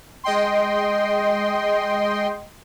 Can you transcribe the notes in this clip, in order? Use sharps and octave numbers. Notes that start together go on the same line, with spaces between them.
G#3 D#5 G5 C6